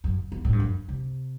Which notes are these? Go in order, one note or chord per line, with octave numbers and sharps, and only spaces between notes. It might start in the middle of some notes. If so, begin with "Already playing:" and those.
F#2
E2
A2
G2
F#2
C3